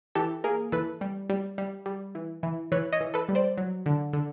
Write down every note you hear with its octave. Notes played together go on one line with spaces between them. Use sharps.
E3 G4 A4
A#3 G#4 A#4
E3 A4 B4
G3
G3
G3
G3
E3
E3
E3 B4 C#5
C#5 D#5
E3
A4 B4
G3
C5 D5
F#3
D3
D3